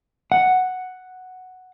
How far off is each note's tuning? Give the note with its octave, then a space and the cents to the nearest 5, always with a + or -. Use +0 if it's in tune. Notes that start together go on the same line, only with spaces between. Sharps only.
F#5 +0